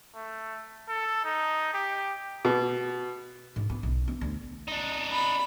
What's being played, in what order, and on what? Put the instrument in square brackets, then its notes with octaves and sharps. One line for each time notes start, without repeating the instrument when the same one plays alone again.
[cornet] A3
A4
D#4
G4
[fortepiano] B2
[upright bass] G#2
B3
B1
B3
D2
[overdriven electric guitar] D4 D#4
[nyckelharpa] B5